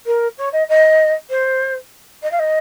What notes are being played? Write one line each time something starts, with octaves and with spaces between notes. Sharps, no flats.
A#4
C#5
D#5
D#5
C5
D#5
F5
D#5